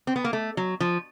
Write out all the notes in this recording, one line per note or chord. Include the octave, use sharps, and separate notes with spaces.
C4
B3
A#3
A3
F#3
F3